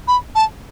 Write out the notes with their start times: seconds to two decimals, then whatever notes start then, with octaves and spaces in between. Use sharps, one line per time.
0.08 B5
0.35 A5